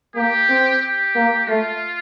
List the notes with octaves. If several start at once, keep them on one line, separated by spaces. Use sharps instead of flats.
A#3 G4
C4
G4
A#3
A3 F4